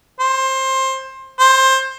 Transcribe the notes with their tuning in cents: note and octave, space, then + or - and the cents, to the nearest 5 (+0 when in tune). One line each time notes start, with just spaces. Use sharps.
C5 +20
C5 +20